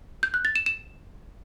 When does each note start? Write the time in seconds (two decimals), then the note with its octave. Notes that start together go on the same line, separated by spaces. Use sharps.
0.23 G6
0.34 F#6
0.45 A6
0.56 E7
0.66 E7